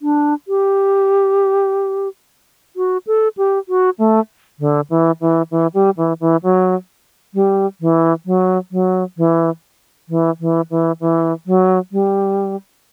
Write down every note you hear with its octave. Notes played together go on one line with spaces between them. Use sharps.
D4
G4
F#4
A4
G4
F#4
A3
D3
E3
E3
E3
G3
E3
E3
F#3
G3
E3
F#3
F#3
E3
E3
E3
E3
E3
F#3
G3